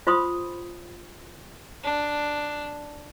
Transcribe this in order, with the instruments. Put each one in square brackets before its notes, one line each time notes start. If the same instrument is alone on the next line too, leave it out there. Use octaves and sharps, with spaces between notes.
[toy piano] F4 C5 B5 C6 D#6
[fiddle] D4